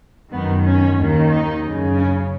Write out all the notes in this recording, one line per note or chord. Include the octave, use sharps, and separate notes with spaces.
F#2 D#3 B3
C#4
D#2 D#3
D#4
F#2 C#3
C#4